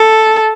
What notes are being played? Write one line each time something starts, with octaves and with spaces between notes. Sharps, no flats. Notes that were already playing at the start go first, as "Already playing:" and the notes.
Already playing: A4